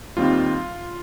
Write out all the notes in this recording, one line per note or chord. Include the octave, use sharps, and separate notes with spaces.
D#2 D#3 G3 C4 F4